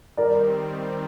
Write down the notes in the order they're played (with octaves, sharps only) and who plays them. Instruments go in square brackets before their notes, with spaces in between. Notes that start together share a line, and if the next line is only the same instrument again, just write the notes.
[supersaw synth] D#3 G3 C4 [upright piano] A#4 D5